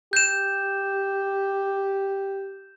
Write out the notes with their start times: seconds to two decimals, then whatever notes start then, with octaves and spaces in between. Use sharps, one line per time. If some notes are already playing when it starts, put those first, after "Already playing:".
0.13 G4 G6 E7